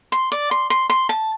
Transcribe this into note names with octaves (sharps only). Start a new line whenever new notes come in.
C6
D5
C6
C6
C6
A5